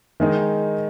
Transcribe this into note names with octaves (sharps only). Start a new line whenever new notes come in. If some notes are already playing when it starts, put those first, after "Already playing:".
D#3 G#3 D#4